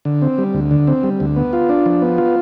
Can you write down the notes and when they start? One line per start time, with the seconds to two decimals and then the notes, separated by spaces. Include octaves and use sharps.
0.05 D3
0.22 C4
0.38 G3
0.54 D2
0.71 D3
0.87 C4
1.03 G3
1.20 D2
1.36 B3
1.53 F4
1.69 D4
1.86 F3
2.02 B3
2.18 F4